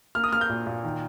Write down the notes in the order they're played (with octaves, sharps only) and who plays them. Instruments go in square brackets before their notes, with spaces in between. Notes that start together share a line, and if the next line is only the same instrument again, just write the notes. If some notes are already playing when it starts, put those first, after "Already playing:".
[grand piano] A#3 F6
D#6
A#3 F6
G6
A#2
A#2
D#3